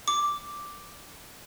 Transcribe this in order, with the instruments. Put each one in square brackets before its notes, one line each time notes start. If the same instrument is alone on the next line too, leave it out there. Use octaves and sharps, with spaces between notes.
[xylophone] D6